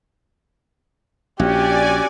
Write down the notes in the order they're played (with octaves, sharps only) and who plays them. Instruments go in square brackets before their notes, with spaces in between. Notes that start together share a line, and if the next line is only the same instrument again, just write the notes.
[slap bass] A#1 [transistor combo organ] C#4 F#4 [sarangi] G4 [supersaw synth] D5 G#5